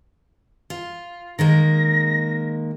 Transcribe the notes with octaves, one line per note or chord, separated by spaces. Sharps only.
F4
D#3 G#3 A#3 A#6